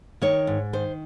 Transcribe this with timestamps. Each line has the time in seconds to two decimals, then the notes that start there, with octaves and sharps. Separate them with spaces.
0.22 D#3 C#5
0.47 G#2
0.73 D#3 C5